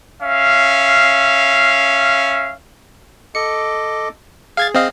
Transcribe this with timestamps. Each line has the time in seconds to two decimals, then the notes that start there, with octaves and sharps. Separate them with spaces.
0.22 C#4 E5 F5
3.35 A4 D#5 D6 C#7
4.57 G#4 F5 G#6 A6
4.74 C4 D#5 F5